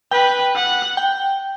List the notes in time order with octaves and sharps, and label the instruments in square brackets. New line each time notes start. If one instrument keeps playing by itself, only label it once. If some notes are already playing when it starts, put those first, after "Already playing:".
[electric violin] B4 [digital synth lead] G5
[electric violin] F#5
[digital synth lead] G5